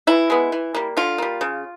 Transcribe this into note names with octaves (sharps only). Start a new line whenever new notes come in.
E3 E4
G#3 B3
E3
G3 A#3
D3 F4
G3 A#3
C#3